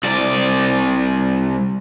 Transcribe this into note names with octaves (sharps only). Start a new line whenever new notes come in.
C2 D5